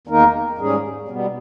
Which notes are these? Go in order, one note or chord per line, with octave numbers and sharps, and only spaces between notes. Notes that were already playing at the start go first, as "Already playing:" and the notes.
E2 D#3 A#3 D#4 A#4
G#2 G3 C#4 G#4
B2 G3 B3